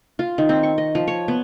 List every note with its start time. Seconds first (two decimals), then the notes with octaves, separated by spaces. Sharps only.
0.19 F4
0.38 D#3
0.49 C4
0.63 C#6
0.78 D#5
0.95 F3
1.08 C#5
1.28 B3